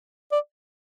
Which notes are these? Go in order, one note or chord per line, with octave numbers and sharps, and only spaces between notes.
D5